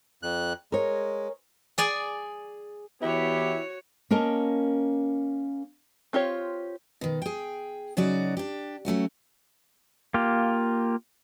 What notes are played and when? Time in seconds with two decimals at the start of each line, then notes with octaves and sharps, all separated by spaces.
0.23 F2 F#6
0.72 G#3 A#4 C#5
1.78 G#4 D5 G#5
3.02 E3 B3 E4 F#4 G4 C#5
4.11 A#3 C#4 A#4 D#5 A5
6.13 C4 F4 G4 C#5
7.01 B2 D#3
7.22 G#4 G5
7.97 C#3 F#3 D#4 F#4 D5
8.37 D4 G4
8.85 F#3 A3 C#4 F#4
10.14 A#3 F4 G4